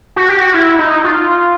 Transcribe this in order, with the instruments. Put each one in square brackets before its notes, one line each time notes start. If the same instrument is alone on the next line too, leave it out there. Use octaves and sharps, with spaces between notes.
[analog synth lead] F#4
G4
F#4
E4
D#4
F4